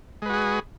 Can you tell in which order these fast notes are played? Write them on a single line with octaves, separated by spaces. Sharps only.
G#3 B4 F#4 G#4